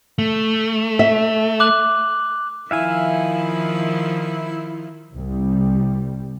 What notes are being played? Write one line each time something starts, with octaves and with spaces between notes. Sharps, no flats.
A3
E5
D6 F#6 F#7
D#3 F3 E4 E5 F5 G#5
C2 G3